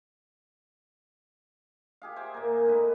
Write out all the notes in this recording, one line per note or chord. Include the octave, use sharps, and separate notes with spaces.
G4 G#4 F5
C5 E5 G#5 D6
A#2 A#3
A2 D#4 B4